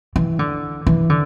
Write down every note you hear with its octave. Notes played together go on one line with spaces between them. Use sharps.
E3
D3
E3
D3